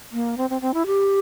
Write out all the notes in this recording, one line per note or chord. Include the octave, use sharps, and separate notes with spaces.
A#3
C4
C4
C4
E4
G4